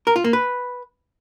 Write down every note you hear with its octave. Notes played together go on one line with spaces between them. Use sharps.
A#4
F4
A#3
B4